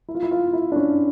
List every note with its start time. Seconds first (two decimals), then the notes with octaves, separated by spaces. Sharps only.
0.08 E4
0.15 F4
0.23 E4
0.31 F4
0.53 E4
0.72 D4
0.76 C#4